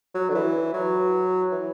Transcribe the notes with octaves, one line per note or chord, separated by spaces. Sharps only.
F#3
D3
E3
F#3
E3